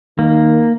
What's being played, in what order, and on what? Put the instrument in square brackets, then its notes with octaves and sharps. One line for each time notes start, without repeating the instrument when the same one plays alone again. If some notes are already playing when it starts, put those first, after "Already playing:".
[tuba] D#3 [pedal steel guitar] A#3